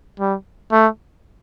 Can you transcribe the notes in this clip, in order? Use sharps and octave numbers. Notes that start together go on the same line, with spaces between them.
G3
A3